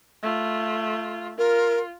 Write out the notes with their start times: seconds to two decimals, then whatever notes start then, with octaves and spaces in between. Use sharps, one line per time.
0.23 A3 F4
1.38 F4 A#4